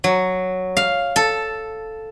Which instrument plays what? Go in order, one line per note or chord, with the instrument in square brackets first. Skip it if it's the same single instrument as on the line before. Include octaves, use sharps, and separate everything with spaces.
[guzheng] F#3
F5
A4